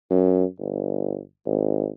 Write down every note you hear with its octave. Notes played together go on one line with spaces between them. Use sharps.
F#2
G1
G#1